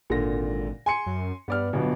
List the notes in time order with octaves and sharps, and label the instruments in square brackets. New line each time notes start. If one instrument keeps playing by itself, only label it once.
[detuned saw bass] G#1 [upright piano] A#2 D3 A#6
[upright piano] G#5 C6 C#7
[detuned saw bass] F#2
[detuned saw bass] G2 [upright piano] B3 D5 F6
[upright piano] G1 B2 F#3 [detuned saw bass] B3